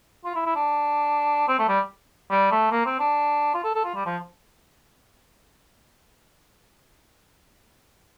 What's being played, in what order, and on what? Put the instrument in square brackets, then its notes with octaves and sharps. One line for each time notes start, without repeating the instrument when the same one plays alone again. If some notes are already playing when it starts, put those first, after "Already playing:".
[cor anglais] F4
E4
E4
D4
C4
A3
G3
G3
A3
A#3
C4
D4
F4
A4
A4
F4
G3
F3